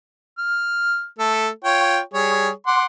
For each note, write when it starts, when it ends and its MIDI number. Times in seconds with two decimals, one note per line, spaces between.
0.38 1.05 89
1.19 1.49 57
1.19 1.49 69
1.64 1.99 65
1.64 1.99 73
1.64 1.99 79
2.14 2.50 55
2.14 2.50 68
2.14 2.50 73
2.67 2.86 78
2.67 2.86 84
2.67 2.86 86